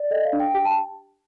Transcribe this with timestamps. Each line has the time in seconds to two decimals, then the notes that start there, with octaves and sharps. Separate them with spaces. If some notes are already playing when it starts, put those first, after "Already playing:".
Already playing: D5
0.11 A4 D#5
0.25 F5
0.33 D4
0.40 G5
0.54 G4 G5
0.65 A5